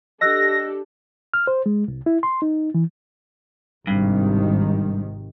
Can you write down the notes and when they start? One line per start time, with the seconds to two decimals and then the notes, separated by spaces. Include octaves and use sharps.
0.21 D4 G4 A4 D#5 E6 F#6 A#6
1.34 F6
1.47 C5
1.66 G#3
1.88 C2
2.06 E4
2.23 C6
2.42 D#4
2.74 E3
3.87 G#1 G2 C3 D#3